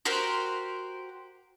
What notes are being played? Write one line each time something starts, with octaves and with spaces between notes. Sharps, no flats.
F#4 G4 A#4 C5